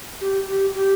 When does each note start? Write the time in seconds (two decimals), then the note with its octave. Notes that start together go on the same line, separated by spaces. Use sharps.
0.21 G4
0.47 G4
0.75 G4